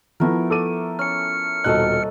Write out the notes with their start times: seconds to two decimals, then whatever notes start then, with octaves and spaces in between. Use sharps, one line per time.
0.20 F3 A3 B3 E4 A#4
0.50 A4 D6 D#7
0.99 C#4 F6 C#7
1.64 D#1 B2 D#4 A4 D#5 F#6